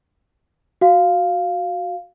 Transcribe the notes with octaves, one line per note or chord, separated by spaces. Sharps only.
F#4 F5